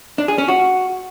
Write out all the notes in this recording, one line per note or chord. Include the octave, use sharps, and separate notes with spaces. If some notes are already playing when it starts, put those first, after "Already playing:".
D4
G#4
C#4
F#4